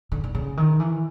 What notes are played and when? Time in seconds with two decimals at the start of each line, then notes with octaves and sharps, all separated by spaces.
0.12 D3
0.24 D3
0.35 C#3
0.57 D#3
0.80 E3